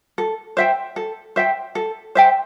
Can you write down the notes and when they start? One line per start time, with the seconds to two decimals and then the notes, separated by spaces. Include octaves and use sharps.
0.18 A4
0.57 C5 E5 G5
0.96 A4
1.36 C5 E5 G5
1.75 A4
2.15 C5 E5 G5